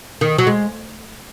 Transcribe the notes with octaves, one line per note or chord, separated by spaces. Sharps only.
D#3
F#3
G#3